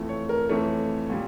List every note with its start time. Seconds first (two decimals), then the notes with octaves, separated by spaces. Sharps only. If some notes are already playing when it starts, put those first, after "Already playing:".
Already playing: F2 E3 A3
0.09 C#5
0.29 A#4
0.49 F2 E3 A3 C#5
1.10 A#2 G3